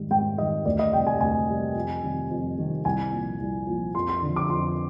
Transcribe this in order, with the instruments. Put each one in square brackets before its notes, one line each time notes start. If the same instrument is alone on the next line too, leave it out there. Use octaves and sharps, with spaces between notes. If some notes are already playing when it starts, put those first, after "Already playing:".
Already playing: [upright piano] G#2 D#3 G3
G#2 G5
D#3 G3 D#5
D2 D5
D#5
C3 G3 G5
G#5
D2 G#5
C3 G3
F2
C3 D#3 G3
F2
C3 D#3 G3
C2 G#5
A#2 F3
C2
A#2 F3
F2 C6
C6
D3
F3
D6
F2 C6